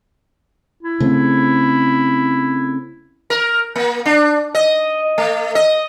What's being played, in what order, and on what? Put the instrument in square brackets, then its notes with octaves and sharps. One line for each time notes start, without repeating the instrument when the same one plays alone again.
[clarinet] E4
[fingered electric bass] C#3 A3 C4
[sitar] A#4
A#3
D4
D#5
A3
D#5